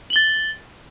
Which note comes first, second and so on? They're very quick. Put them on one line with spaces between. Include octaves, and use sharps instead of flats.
F#7 G7 A6